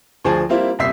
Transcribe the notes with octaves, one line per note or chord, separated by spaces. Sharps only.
D2 F3 G#4 A5
G3 A#3 C4 E4 F4
D#1 C2 E5 B6 C7